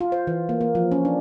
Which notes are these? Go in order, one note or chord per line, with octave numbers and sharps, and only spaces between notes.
F4
C5
E3
A#3
A#3
F3
C#4
D4